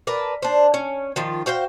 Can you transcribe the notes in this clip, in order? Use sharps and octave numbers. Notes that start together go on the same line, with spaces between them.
A#4 B4 D5 A5
D4 C5
C#4
D#3 F3 F4
F#4 C5 F5 G5